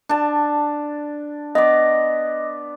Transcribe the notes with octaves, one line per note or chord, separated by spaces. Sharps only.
D4 A5
B3 D5 D#5